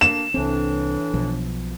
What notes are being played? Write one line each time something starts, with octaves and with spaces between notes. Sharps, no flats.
A#3 D4 E7
C2 A2 E3 C4 D4
B1 B2 F3